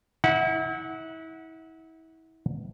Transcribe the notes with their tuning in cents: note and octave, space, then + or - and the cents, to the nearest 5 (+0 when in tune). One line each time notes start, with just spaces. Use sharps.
E4 -35 F#5 -5